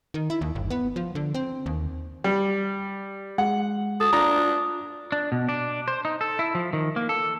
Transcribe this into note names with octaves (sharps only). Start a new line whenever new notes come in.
D#3
E4
D#2
G1
B3
F3
D3
C4
D#2
G3
G#3 F#5
A4 D#6
D4 F4 A#5
D4
B2
D4
C5
D#4
A4
E4
F3
D#3
A#3
A4